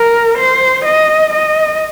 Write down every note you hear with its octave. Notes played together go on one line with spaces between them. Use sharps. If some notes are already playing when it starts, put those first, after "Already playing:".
Already playing: A#4
C5
D#5
D#5